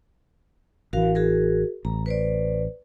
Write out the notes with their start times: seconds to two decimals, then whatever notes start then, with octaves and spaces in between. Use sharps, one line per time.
0.93 A1 E3 F#4 A#4 F5
1.15 F#4 G#4 A#4
1.85 A1 A#5
2.06 B4 C5 D5